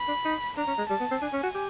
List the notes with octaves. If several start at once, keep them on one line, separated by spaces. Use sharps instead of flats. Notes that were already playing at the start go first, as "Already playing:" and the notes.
Already playing: B5
D4
D#4
D4 A#5
C#4
G#3
G3 A5
B3
C4
D4 G#5
C#4
F#4
G4